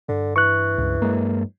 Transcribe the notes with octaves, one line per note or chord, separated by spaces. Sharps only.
G2 D3
E3 C#6 F#6
C#2 G2
F#3 G#3 A#3